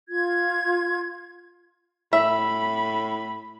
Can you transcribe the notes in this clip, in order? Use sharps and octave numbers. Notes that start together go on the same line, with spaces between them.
F4 G#6
A2 E5 B5